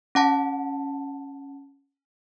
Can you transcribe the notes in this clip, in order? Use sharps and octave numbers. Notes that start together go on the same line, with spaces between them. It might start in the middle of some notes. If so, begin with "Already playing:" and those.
C#4 F#5 A5